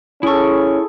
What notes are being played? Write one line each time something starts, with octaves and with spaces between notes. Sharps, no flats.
C#4 E4 G#4 A4 C#6